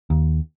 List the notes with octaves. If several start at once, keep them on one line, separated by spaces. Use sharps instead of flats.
D#2